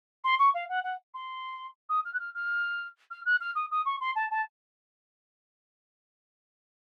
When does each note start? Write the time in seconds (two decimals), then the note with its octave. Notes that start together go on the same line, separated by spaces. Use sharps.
0.24 C6
0.39 C#6
0.54 F5
0.69 F#5
0.84 F#5
1.14 C6
1.89 D#6
2.05 F6
2.14 F#6
2.20 F6
2.35 F6
3.11 F6
3.26 F#6
3.41 F6
3.56 D#6
3.71 D#6
3.86 C#6
4.01 C6
4.16 A5
4.31 A5